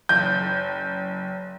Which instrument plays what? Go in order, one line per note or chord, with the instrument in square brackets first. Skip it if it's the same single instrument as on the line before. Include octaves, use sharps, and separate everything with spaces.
[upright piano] F#1 [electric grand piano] G6